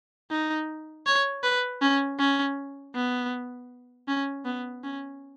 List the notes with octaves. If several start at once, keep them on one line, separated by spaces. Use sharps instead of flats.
D#4
C#5
B4
C#4
C#4
B3
C#4
B3
C#4